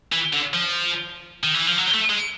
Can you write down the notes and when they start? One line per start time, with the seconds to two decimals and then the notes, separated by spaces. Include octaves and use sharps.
0.12 E3
0.33 D3
0.54 F3
1.43 D#3
1.54 E3
1.67 F3
1.78 F#3
1.94 A3
2.10 G#3